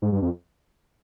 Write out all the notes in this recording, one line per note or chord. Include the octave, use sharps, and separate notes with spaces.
G#2
G2
F2